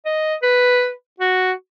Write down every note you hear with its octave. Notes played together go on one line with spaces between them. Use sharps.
D#5
B4
F#4